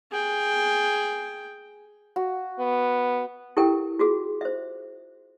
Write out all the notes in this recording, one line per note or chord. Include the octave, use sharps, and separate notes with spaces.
G#4 G5
F#4
B3
E4 G4 A4 A#4 G5
F4 F#4 G#4
C5 E5